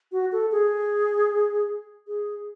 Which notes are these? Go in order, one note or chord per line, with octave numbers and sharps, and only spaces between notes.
F#4
A4
G#4
G#4